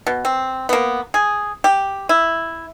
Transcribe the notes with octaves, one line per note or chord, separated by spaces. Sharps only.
B2
C4
A#3 B3
G#4
G4
E4